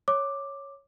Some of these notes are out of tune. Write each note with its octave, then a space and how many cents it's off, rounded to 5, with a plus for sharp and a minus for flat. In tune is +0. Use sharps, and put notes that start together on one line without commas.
C#5 +0 D6 +5